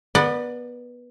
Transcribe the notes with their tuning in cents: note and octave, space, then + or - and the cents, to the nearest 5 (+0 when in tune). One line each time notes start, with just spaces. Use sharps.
B3 -15 A#4 +0 D5 +20